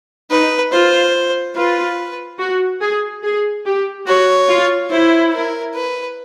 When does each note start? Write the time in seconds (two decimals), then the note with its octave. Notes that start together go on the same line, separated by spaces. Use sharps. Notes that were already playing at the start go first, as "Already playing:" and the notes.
0.30 D#4 B4
0.72 F4 C5
1.56 F4 B4
2.39 F#4
2.81 G#4
3.23 G#4
3.65 G4
4.07 F#4 C#5
4.49 F4
4.91 E4 C5
5.33 A#4
5.75 B4